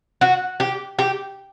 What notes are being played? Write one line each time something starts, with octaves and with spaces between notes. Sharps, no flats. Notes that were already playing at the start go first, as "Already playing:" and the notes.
F#4
G4
G4